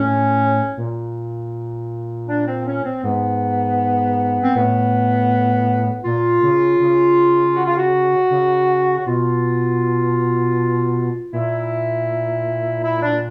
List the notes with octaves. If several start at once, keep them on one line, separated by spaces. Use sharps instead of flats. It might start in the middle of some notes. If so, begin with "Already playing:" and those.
Already playing: A2 C#4
A#2
D4
C4
C#4
C4
G#2 B3
C4
A2 B3
A#2 F4
C#3
C#3
F#4
F4
F#4
C#3
F#4
B2 F4
A#2 E4
E4
D4